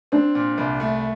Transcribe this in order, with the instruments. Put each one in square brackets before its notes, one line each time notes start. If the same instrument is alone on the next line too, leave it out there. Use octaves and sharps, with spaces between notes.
[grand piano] C4 [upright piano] D4
[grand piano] A#2
C2
A3